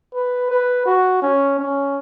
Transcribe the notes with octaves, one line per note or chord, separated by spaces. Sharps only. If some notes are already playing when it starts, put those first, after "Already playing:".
B4
B4
F#4
C#4
C#4